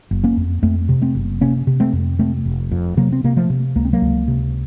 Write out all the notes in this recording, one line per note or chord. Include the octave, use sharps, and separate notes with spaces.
F#1
A#3 C#4
F2
F2 A3 C4
C3
A3 C4
F#1
C3 A#3 C#4
C3
A3 C4
F2
C3 A3 C4
F1
F2
C3 F#3 A#3
C4
C3 A#3
F3 A3
C3
C#2 A#3
C4
F#3 A#3
C#2
C3